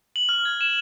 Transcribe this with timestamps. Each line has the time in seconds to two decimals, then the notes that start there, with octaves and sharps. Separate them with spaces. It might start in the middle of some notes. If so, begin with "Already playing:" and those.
0.16 F#7
0.29 F6
0.45 G#6
0.61 E7